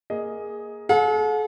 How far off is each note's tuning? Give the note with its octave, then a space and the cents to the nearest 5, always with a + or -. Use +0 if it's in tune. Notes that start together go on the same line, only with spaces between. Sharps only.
A#3 +0 G#4 +0 D#5 +15
A4 -45 F#5 -45